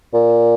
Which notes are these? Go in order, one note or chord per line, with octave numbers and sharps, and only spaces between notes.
A#2